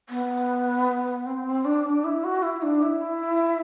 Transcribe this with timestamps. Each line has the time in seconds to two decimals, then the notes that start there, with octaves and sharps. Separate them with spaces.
0.09 B3
1.26 C4
1.64 D4
2.04 E4
2.24 F#4
2.42 E4
2.62 D4
2.82 E4